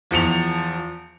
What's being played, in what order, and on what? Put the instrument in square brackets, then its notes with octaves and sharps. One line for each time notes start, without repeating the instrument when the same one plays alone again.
[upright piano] E2 F3 C#7 F7